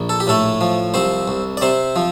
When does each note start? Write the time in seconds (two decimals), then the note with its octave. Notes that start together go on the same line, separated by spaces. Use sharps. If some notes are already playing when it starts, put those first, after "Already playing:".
Already playing: A#1
0.09 A4
0.20 G4
0.27 A2 A3 A4
0.61 F3
0.94 C2 C4 C5
1.28 C2
1.57 D5
1.61 C3 C4 C5
1.96 F3